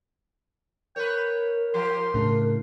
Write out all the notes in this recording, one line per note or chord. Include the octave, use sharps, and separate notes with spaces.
A#4 B4 C#5 G5
F3 F4 G4 C6
A2 C#3 D4